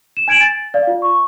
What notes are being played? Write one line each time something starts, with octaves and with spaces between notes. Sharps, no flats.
E7
G#5 G#6 D7 E7 F#7
A6
D5 F5
F4
C#6